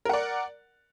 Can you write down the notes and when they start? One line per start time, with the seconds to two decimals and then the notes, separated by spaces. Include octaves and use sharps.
0.05 A#4
0.09 F#5
0.13 D5